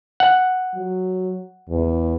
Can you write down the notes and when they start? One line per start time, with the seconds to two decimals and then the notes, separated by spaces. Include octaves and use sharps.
0.20 F#5
0.74 F#3
1.69 E2